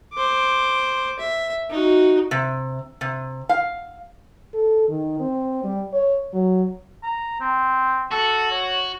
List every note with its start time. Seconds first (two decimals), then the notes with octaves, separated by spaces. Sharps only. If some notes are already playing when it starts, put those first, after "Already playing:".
0.14 C5 D6
1.19 E5
1.70 D#4 F#4
2.31 C3
3.01 C3
3.49 F5
4.54 A4
4.89 D#3
5.20 C4
5.64 G3
5.93 C#5
6.33 F#3
7.03 A#5
7.40 C4
8.12 F#4 A4
8.51 C#5